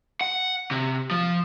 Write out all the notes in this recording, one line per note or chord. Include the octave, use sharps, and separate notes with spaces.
F#5
C3
F3